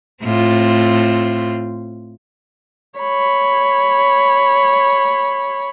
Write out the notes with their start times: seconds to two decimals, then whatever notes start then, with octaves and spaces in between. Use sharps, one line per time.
0.23 A2 C4 F4
2.99 C#5 B5